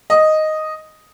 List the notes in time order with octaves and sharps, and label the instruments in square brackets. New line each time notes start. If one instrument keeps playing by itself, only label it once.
[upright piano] D#5